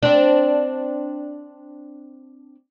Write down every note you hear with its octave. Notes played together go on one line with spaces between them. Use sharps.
C4 D4